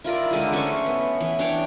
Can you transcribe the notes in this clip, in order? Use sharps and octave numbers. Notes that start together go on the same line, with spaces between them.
E4 F4 A#4 D5
D3 G#3 E4
A3 C#4 C5 C#6
B3
E3
D4 C#5 G5